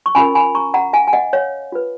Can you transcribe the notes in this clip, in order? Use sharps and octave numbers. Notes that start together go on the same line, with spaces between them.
C#6
C#4 F4 A#4 G#5 B5
G#5 B5
A#5 C#6
F#5 A#5
F5 G#5
G#5
D#5 F#5
C#5 F5
F4 B4